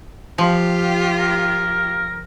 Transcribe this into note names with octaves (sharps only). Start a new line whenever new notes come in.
F3 F4 G4
A#4